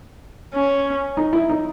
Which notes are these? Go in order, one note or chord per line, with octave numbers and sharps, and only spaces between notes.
C#4
D#4
E4
D#4